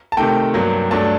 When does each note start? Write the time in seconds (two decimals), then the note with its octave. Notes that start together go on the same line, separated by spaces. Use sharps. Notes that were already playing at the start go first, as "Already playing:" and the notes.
0.12 A5
0.17 C3 D#3 A3 G5
0.54 G2 F#3 A#3
0.91 G2 F#3 A3 D4 A5